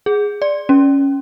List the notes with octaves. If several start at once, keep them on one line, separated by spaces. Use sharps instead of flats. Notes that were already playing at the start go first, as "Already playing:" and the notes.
G#4
D5
C#4